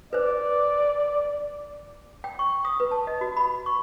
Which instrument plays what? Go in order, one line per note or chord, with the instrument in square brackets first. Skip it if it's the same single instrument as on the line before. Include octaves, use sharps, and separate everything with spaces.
[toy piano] B4 C5 [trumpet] D5
[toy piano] G5
C#6
D#6
B4
A5
D#5
F#4
B5
C#6